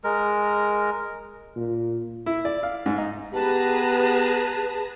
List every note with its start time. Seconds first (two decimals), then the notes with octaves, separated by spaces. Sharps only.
0.04 G#3 A#4
1.56 A#2
2.26 E4
2.45 D5
2.63 F5
2.86 G#2
2.98 D#4
3.34 B3 G4 G#4 B4 A5 A#5